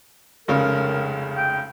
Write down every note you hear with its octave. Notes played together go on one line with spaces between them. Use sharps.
F1 C#2 C#3 A#4
G5